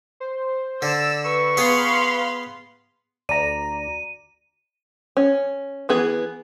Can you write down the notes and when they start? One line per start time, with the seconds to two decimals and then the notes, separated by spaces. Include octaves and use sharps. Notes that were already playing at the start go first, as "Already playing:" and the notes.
0.20 C5
0.82 D3 D5 E6
1.25 B4 C#6
1.57 B3 G#4 F5 B5 C6
3.29 D2 D5 A#5 D#7
5.17 C#4
5.89 E3 B3 G#4